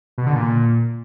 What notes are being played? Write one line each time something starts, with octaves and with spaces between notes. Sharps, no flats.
B2
D3
A#2